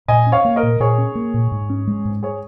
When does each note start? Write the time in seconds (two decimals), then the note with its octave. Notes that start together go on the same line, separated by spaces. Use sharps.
0.08 A#2 D#5 G#5
0.27 C#4
0.32 C#5 F5
0.45 A#3
0.56 A#4 D#5
0.63 A#2
0.80 A#2 G#4 C#5
0.98 C#4
1.15 A#3
1.34 A#2
1.52 G#2
1.70 C#4
1.87 G#3
2.05 G#2
2.23 G#4 C#5